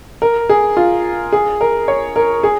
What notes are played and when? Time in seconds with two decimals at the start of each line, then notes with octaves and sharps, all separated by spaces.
0.22 A#4
0.49 G#4
0.77 F4
1.32 G#4
1.61 A#4
1.88 C#5
2.16 A#4
2.43 G#4